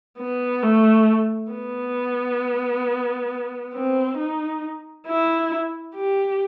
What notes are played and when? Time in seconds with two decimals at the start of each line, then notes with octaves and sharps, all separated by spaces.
0.18 B3
0.63 A3
1.52 B3
3.74 C4
4.17 D#4
5.07 E4
5.95 G4